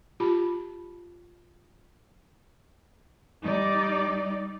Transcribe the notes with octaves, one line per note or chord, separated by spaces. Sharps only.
F4 G4 A5 B5
G3 D#4 D5